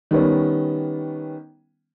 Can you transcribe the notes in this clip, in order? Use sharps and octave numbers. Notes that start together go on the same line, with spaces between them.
D#3 G3 B3 C#4